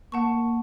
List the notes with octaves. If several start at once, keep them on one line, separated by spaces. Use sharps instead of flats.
A#3 F#5 A5 C#6